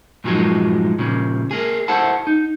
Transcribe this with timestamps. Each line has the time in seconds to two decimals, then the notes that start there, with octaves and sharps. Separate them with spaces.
0.24 G2 A#2 F3 F#3 G#3 D#4
0.99 A#2 C#3 F3
1.51 A#3 G#4
1.88 E4 A4 C5 F#5 A5
2.27 D#4